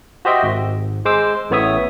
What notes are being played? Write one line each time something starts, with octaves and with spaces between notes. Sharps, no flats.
F#4 G4 C5 D#5 E5 G5
G#1
G#3 C5 D6 E6
A1 A2 B3 C#5 E5 D#6